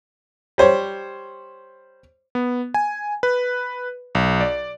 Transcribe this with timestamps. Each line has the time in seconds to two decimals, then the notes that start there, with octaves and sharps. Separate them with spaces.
0.58 G3 C5 C#5
2.35 B3
2.74 G#5
3.23 B4
4.15 B1
4.41 D5